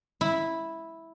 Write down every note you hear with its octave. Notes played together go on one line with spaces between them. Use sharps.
E4